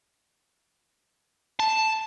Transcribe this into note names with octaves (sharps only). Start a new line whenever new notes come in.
A5